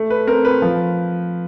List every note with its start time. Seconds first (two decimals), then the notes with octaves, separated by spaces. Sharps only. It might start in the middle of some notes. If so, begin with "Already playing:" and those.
Already playing: A3
0.10 B4
0.27 C4 A#4
0.45 B4
0.62 F3